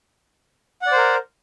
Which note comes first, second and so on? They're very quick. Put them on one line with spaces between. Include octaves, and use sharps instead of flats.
F#5 D5 C5 A#4